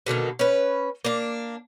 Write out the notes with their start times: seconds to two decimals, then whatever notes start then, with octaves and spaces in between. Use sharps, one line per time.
0.06 B2 D3 D#3 A#3
0.39 C#4 B4
1.05 A#3 D4